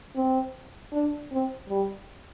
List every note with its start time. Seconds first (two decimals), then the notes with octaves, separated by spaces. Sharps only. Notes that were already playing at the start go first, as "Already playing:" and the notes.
0.16 C4
0.93 D4
1.32 C4
1.69 G3